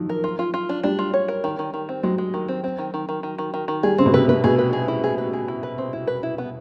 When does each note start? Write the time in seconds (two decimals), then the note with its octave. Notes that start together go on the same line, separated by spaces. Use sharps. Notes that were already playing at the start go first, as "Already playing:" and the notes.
Already playing: D#3 F3 F#3
0.09 A#4
0.24 F4
0.39 F4
0.54 F4
0.69 D4
0.83 G3 D4
0.99 F4
1.14 C#5
1.28 A#4
1.44 D#3
1.59 D#3
1.74 D#3
1.89 C4
2.03 F#3 G#3
2.18 G#3
2.34 D#3
2.48 C4
2.64 C4
2.78 D#3
2.94 D#3
3.09 D#3
3.23 D#3
3.38 D#3
3.54 D#3
3.68 D#3
3.83 G3 G#4
3.98 C#3 C4
4.06 B2
4.14 C3 B4
4.28 C3 B4
4.44 B2 G#4
4.58 B4
4.73 G#4
4.88 E4
5.04 G#4
5.18 B4
5.33 G#4
5.48 E4
5.63 B4
5.78 C4
5.93 E4
6.07 B4
6.23 E4
6.38 B3